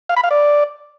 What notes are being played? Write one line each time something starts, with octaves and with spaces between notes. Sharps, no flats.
F5
B5
F5
D5